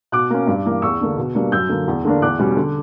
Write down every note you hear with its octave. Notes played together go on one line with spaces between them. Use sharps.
B2 D6 F#6
A#3 C#4
G2
E3 A#3
E2 C#6 E6
D3 A#3 D4
B2
G3 A#3 D4
F#2 E6 G6
D3 A#3
E2
D3 A#3 D4
E2 D6 F#6
B2 G3 C#4
D3